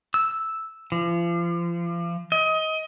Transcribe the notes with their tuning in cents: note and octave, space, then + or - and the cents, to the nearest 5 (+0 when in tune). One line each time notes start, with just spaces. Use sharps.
E6 -5
F3 -35
D#5 +25